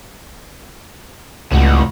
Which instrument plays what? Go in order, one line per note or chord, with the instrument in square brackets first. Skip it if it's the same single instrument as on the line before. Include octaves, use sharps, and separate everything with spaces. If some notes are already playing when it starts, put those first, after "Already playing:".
[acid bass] C#2 [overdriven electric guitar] A2 F#4